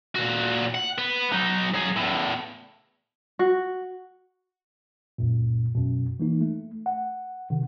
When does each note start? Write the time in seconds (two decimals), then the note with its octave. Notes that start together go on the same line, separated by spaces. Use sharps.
0.15 A#2 F#4
0.74 F#5
0.98 B3
1.32 F#3 D#4
1.74 F#3 G#4
1.96 E2 A2
3.39 F#4
5.18 C#2 F#2 A#2
5.75 F#2 B2
6.20 E3 A#3 D#4
6.41 A3
6.86 F#5
7.50 C3 D#3